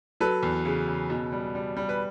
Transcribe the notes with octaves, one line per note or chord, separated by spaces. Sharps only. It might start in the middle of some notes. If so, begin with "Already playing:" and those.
F#3 A4 B4
E2
C#3
C#3
B2
G3
G3
G3
B4